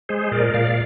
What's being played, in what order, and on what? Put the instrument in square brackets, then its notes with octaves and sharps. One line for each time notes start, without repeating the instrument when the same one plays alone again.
[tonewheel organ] G#3 G#4 C5
A#2 A#4 D5
A#2 D5 F5